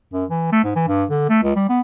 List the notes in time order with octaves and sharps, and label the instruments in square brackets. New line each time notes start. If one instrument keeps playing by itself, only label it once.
[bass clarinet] F#2
E3
A3
G#2
E3
G2
D3
A3
C#2
G3
B3